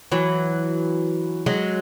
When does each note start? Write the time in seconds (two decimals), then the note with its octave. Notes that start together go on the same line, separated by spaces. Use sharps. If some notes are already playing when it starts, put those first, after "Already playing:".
0.12 E3 F#3
1.46 F#3 G#3